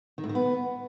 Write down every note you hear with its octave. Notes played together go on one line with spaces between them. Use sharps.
D#3
A2
D#3
B3